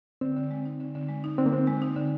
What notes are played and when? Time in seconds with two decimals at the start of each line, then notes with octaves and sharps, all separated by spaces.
0.21 D3 C4
0.36 D3
0.51 G#3
0.65 D#4
0.80 D3
0.95 D3
1.09 G#3
1.24 D#4
1.38 D3 C4
1.46 A#3
1.53 D3 C4
1.67 G#3
1.82 D#4
1.96 D3